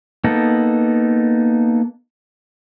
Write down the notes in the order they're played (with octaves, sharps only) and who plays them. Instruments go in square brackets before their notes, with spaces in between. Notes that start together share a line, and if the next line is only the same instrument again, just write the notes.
[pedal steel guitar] A#3 B3 D#4 A4